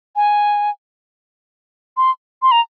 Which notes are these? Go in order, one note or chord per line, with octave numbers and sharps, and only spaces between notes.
G#5
C6
C6
A#5